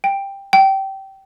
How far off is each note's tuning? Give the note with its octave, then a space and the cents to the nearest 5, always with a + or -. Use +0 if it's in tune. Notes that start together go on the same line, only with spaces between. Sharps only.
G5 +10
G5 -20